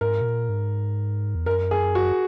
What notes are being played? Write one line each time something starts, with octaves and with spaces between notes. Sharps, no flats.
G#2 A#4
B2
A#2
G#2
E2
F#2 A#4
G#4
F#4